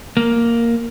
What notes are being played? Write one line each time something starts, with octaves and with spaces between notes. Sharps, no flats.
A#3